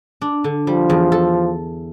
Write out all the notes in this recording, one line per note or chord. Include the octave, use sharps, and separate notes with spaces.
D4
D3
F3 G3
E2
A4